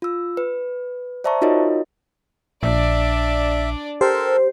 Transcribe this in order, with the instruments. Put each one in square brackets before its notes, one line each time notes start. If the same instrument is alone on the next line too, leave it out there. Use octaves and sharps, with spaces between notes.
[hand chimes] F4 E6
B4
C5 D5 E5 A5 A#5 C#6
D#4 F4 F#4 A#4 C#5 D#5
[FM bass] A#1 [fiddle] D4 D5 [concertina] E5
[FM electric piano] G4 C5 [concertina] A4 A#4 A5